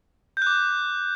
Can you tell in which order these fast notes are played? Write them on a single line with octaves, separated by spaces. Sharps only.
G6 F#6 D6